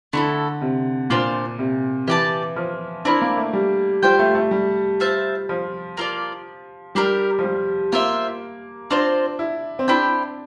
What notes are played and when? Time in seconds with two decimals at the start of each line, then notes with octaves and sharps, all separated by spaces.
0.13 D3 A3 E4 A4
0.61 C3
1.10 A#2 D4 F4 C5
1.59 C3
2.08 E3 G4 D5 A5
2.56 F3
3.05 C4 D4 E4 A#4
3.22 A#3
3.37 A3
3.53 G3
4.03 G3 F4 C5 G5
4.19 A3
4.35 A3
4.51 G3
5.00 F4 C5 E5 A5
5.49 F3
5.97 A#3 F4 A4 D5
6.95 G3 D4 G4 A#4
7.39 F3
7.44 G3
7.92 A#3 F4 C5 E5
8.91 C4 D4 F4 C5
9.39 E4
9.79 C4
9.88 D4 E4 G4 C5 G5